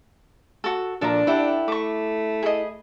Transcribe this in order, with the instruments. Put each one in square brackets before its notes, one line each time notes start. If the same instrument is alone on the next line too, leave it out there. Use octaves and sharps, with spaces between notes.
[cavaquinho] F#4 A4
[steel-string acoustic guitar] A#2 F3 D5 [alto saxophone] D4 [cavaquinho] A4 A#5
[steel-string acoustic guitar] E4 [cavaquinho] G4 A4 F#5
[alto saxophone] A3 [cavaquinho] C#6 D6
[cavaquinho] G#4 D#5